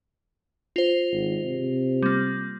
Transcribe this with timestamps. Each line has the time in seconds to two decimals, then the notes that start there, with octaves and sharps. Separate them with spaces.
0.76 F4 C5
1.12 G#1
1.44 C3
2.02 G3 A#3